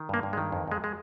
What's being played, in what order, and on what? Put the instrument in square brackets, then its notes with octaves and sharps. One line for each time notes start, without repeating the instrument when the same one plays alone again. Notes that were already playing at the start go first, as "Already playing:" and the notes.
Already playing: [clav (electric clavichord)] D#3
G2 A#3
G2
G#3
D#3
F2
F2 G#3
G#3